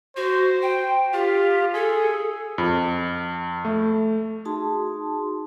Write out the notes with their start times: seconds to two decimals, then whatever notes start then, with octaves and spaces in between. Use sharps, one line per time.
0.17 F#4 C5
0.62 G5
1.14 F4 G4
1.74 G#4 A4
2.58 F2
3.65 A3
4.45 D#4 F#4 G#4 A5 C6